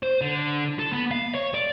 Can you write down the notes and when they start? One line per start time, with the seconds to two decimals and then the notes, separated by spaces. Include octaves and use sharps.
0.03 C5
0.21 D3
0.79 A4
0.93 B3
1.11 F5
1.35 C#5
1.55 D5